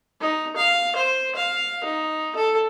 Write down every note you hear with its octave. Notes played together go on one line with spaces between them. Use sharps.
D#4
F5
C5
F5
D#4
A4